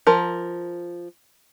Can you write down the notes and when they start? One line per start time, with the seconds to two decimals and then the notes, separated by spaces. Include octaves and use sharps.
0.07 F3 A#4